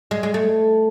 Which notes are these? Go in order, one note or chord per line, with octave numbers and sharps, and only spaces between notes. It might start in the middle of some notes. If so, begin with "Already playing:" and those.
G#3
G#3
A3